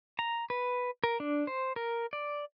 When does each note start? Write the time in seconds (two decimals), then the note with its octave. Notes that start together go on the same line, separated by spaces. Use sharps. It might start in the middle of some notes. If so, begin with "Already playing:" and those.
0.19 A#5
0.50 B4
1.04 A#4
1.20 D4
1.47 C5
1.76 A#4
2.13 D5